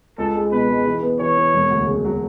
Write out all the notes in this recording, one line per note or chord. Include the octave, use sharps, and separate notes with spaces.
C#2 A4
G#3
B2 B4
G#3
E3
B3
E3 C#5
E3
E1
D2
C#3
F#3